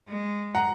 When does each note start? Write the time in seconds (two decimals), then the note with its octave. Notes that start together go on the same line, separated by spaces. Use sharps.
0.08 G#3
0.55 F#5 A#5